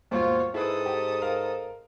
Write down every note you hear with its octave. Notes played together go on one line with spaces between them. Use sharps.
D#2 G#2 B2 F4 C5 C#5
G#2 E4 G#4 A4 B4 D#6
G4
A#4 F5